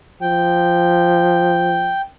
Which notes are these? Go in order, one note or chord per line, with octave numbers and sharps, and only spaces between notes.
F3 G5